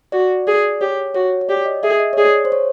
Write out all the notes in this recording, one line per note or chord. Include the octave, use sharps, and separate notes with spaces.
F#4 D5
G#4 D5
G4 C#5
F#4 C#5
C#5
G4 D5
D#5
G#4 E5
D#5
C#5
G#4 D5
C5
C#5